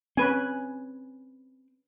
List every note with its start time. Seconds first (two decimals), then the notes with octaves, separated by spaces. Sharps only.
0.17 C4 C#4 B4 G#5